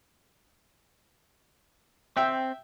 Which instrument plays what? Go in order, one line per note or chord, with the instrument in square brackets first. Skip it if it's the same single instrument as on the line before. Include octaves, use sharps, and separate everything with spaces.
[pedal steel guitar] C4 [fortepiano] E5 G5